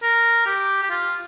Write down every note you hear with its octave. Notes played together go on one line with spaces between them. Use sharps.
A#4
G4
G4
F4